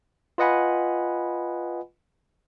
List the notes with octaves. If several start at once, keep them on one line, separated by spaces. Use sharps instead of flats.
F4 B4 D#5 F#5 G#5 B5